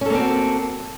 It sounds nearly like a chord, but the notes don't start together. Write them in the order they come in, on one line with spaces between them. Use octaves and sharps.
C#4 A4 A#3 C4 F#4